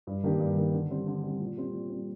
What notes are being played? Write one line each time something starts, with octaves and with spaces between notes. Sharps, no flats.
G2
D#3 A#3 D4 G4
G2
D#3 A#3 D4 G4
D3
G3 C4
D3
G3 C4
A#2
G3 C4
A#2
G3 C4